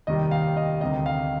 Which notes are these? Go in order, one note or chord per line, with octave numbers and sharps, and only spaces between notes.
F1 D#2 D#3 G3 D#5
F5
D#5
D2 C3 D#3 G3 D#5
F5